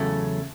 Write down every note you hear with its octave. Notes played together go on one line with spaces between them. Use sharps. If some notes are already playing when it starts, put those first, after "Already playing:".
Already playing: E2 C#3 F#3 A3